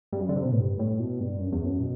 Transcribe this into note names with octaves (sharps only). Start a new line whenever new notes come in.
G2
F#2
D3
C3
B2
A2
G2
A2
B2
G2
F#2
E2
F#2
B2